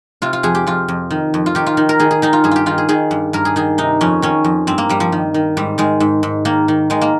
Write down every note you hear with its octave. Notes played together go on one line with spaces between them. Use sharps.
C3 F4
F4
F2 G#4
G4
F2 F4
F2
D#3
F2
F4
D#3 G4
F4
D#3
A#4
D#3 G#4
G#4
D#3 D#4
F4
G2 G#4
F4 G4
D#3 F4
G#4
D#3 G#4
G2
G2 A#4
G#4
D#3 G#4
C3 D#4
F2 C#4
D#3 C#4
F2
G2 C4
A#3
G2 G3
F3
D#3
D#3
G#2 G3
D#3 G#3
G#2
G#2
D#3 A#3
D#3
D#3 G#3
A#3